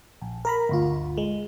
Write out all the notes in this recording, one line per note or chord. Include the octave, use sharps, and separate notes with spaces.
A#1
A#4 A#5 B5
G1 D2 F4
G#3